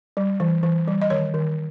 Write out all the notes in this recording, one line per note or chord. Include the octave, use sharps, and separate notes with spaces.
G3
E3
E3
G3
D#5
D#3 C#5
D#3